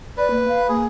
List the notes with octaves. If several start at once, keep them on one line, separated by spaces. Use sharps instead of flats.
B4 D5
A#3
F5
A#3 G#4